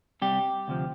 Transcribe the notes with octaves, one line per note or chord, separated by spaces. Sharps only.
C2 C3 G3 G4
D2 C3 F3